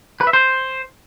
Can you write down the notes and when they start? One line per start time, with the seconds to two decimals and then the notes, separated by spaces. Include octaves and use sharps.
0.21 B4
0.27 E5
0.33 C5